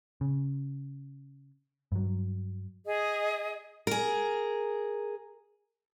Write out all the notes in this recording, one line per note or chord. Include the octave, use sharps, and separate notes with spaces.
C#3
G2 F#3
G#4 D#5
G#4 A#4